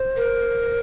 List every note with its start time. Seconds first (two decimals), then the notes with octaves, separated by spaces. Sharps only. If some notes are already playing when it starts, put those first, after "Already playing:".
Already playing: C5
0.16 A#4